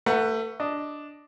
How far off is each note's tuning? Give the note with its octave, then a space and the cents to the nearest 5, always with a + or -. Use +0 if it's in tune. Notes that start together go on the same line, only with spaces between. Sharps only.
A3 +30 B4 +0 F#5 +0
D4 +0 D#5 +0